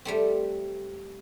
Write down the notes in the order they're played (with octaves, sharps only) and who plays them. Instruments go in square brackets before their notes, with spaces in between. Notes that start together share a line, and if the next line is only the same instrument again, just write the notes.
[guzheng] G3 A3 C4